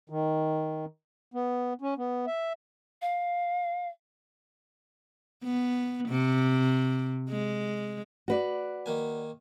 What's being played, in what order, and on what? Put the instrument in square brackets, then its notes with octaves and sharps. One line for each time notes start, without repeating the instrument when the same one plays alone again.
[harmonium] D#3
B3
C#4
B3
E5
[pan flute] F5
[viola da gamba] B3
C3
G#3
[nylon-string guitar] F#4 B4 D5
[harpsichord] D#3 A#3 G#5